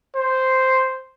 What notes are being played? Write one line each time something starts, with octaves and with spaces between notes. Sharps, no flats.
C5